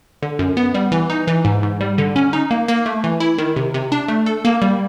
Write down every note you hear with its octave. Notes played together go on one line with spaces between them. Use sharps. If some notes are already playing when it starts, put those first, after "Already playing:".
D3
F#2
B3
G3
E3
D#4
E3
G#2
G#2
G3
D3
C#4
D#4
A#3
A#3
A3
E3
E4
D#3
C3
C3
D4
A3
A4
A#3
G3